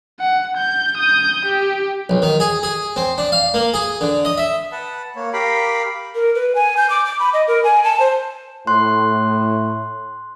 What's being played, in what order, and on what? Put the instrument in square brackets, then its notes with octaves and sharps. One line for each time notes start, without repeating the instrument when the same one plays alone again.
[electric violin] F#5
G6
D#6 G6
G4
[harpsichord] B1
D#3
G#4
G#4
C4
D4
F5
A#3
G#4
D3
D#5
E5
[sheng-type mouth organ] B4 F#5 A5
A#3 C#5
G4 A#4 F5 G5 B5
[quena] A#4
B4
G#5
G6
D6
D6
B5
D#5
A#4
G#5
A5
C5
[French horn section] A2 [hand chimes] C6 F#6